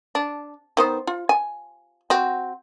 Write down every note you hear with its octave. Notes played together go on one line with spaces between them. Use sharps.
D4
D#3 B3 C5
F4
G#5
C4 F#4